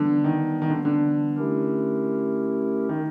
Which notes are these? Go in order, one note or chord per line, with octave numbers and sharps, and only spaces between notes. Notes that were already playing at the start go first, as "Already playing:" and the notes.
Already playing: D3 E3 G3 B3 D4
D#3
D#3
D3
D3
A3 C#4 E4 G4 A#4
D#3